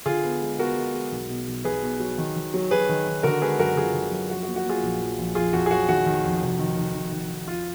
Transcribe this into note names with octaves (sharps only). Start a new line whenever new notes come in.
D3 F4 G#4
B3
G#3
B3 F#4 A#4
G#3
G#3
B1
B2
B1
B1 G#4 B4
B2
F#3
D#3
D#3
F#3
F#3 G#4 B4
D#3
D#3
D3 F#4 A#4
G#3 G#4 B4
F#2 F#4 A#4
D3 F4 G#4
D3
F#2
F3 F#4
F#4
A#3
F#4
A#3 F4 G#4
A#1
F3
A#1
F2 F4 G#4
F2 F#4
G#4
F#3 F#4
D#3 F#4
D#3
F2
F1
D#3
F1
F1
D#3
D#3
F2 F4